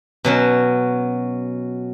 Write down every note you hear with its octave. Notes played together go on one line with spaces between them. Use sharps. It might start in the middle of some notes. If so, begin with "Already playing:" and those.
B2 F#3 C#4